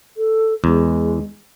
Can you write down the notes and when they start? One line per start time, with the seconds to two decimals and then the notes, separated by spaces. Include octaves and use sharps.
0.17 A4
0.64 E2 G#3